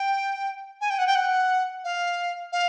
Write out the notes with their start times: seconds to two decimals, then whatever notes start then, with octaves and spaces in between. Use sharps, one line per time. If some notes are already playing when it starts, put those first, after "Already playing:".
Already playing: G5
0.81 G#5
0.90 G5
0.99 F#5
1.07 G5
1.15 F#5
1.84 F5
2.52 F5